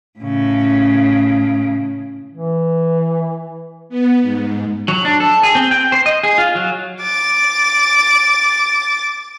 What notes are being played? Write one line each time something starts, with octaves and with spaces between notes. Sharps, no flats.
A2 C#3
E3
B3
G#2
F#3
D4
A4
G#4
C4
G5
C5
D#5
G#4
F4
F#3
D6 A6